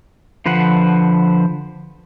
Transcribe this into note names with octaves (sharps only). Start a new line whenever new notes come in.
D3 F3 B4 C5 F#5